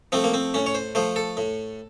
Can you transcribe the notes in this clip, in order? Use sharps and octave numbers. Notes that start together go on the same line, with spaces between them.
F3 A3 C4
A#3
C4
A2 C#4
C#5
C5
F3 A3 C5
A4
A2